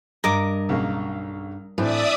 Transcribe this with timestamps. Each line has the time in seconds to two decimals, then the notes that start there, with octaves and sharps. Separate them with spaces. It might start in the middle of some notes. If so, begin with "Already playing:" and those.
0.24 G2 A#4 D#5 D6
0.69 B1 C#3 A#3
1.78 A2 E3 C4 D4 D5 E5 D#6